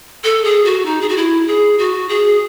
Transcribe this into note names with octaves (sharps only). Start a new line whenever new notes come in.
A4
G#4
F#4
D#4
G#4
F#4
E4
G#4
F#4
G#4